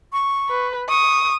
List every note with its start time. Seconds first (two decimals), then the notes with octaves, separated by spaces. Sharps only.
0.13 C#6
0.49 B4
0.89 C#6 D#6